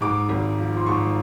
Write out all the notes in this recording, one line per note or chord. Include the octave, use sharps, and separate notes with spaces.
G#2 D6
G#1
F3
C6
G#2 C#6